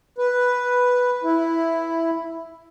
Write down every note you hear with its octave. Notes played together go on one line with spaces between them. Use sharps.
B4
E4